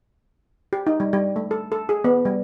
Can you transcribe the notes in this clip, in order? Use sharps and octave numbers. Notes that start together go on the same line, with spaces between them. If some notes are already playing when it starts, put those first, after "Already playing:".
G4
D#4
G3
G3
A3
A4
A4
G#4
B3
G3